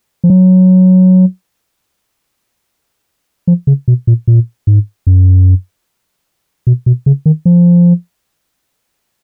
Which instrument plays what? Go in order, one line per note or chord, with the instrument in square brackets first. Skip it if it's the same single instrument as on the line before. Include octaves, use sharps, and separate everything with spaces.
[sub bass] F3
F#3
F3
C#3
B2
A#2
A#2
G#2
F#2
B2
B2
C#3
D#3
F3